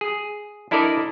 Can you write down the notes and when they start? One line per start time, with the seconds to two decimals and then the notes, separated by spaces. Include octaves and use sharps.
0.01 G#4
0.71 D4 E4 A4 A#4 D5 D#5